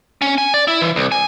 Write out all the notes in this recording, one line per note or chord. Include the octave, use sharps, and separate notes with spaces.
C#4
G#5
D5
E4
E3
C2
G#5